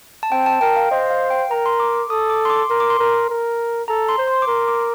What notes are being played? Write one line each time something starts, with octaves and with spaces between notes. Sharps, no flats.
A5
C4 G5
A5
A#4 G5
F5
C5 D#5
F5
G5
A#4 A#5
C6
D6
D6
A4 D#6
D6
C6
D6
A#4 C6
D6
C6
A#4
A#4
A4 A#5
C6
C5
C6
D6
A#4 C6
D6